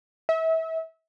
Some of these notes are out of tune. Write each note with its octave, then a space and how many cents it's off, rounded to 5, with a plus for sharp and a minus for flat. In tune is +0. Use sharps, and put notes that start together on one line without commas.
E5 -30